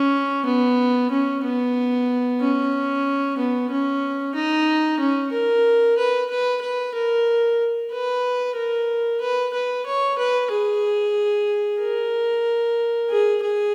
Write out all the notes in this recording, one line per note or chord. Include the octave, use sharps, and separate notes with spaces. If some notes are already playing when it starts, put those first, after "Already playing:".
Already playing: C#4
B3
C#4
B3
C#4
B3
C#4
D#4
C#4
A#4
B4
B4
B4
A#4
B4
A#4
B4
B4
C#5
B4
G#4
A#4
G#4
G#4